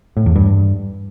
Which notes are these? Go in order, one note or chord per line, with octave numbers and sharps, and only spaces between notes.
A2
E2
G2